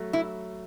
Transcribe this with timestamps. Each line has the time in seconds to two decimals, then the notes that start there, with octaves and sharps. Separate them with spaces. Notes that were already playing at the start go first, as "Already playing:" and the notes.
Already playing: F#3 A3
0.13 E4